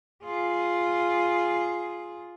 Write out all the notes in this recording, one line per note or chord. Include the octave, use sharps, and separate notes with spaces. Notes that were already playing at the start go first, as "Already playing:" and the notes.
F4 G#4